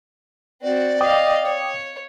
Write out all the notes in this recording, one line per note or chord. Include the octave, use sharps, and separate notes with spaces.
C4 F#4 D5
D#5 F5 G5 D6 D#6
C#5